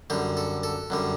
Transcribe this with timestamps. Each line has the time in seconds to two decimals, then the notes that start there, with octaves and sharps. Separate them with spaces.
0.10 F#2 D3 G3 G4
0.37 A4
0.63 A4
0.90 F#2 D3 G3